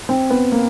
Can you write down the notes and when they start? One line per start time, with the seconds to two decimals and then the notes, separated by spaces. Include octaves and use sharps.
0.09 C4
0.30 B3
0.52 A#3